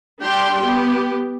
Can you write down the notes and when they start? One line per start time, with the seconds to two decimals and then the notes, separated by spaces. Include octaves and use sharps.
0.21 G3 D4 G4 G5 C6
0.64 B3 G4